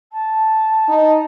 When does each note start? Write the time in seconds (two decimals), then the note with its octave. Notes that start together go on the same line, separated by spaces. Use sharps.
0.12 A5
0.88 D#4